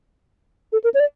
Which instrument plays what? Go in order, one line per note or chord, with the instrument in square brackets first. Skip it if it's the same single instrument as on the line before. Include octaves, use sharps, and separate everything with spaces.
[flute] A4
A#4
C#5
D5